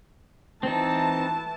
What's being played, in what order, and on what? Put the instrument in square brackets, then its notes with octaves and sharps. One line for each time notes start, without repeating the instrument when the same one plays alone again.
[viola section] E3 A5 [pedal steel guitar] C4 D#4